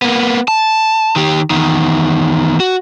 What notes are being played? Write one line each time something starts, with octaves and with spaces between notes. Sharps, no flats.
A#3 B3
A5
D#3 G4
E2 D#3
F#4